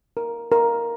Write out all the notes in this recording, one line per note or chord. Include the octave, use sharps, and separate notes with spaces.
A#4
A#4